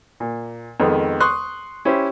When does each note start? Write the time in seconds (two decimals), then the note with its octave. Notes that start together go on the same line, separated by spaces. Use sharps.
0.20 A#2
0.80 F2 D#3 G#3 B3
1.20 C6 C#6 D#6 F#6
1.85 C#4 E4 G4 C5